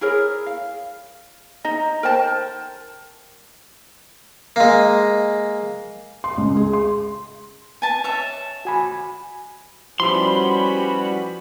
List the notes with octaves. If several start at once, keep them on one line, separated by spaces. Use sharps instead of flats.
E4 G#4 A#4 C#5
F5
D#4 D#5 A#5
A#4 C5 G5 A5
G#3 A#3
C6
C#2
G#4
C6
G#5 A5
C#5 E5
F#4 G#5 B5
F3 G3 B3 C#4 E4 F#4 B5 C6